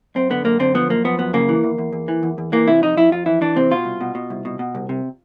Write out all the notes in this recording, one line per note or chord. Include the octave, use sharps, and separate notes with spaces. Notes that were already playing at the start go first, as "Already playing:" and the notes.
F#2 C4
D3 B3
F#2 A#3
D3 C4
F3 B3
F#2 A#3
F3 B3
F#2 B3
C#3 A#3
E3
E2
E2
E2
E3
E2
E2
E3 A#3
C3 E4
F2 D#4
F2 E4
F2 F4
E3 E4
E3 D4
C3 C4
B2 F4
C2
B2
B2
C2
B2
B2
C2
C3